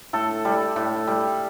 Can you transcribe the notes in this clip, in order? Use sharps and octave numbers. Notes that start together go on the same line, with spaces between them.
A2 A4
G3
A2
G3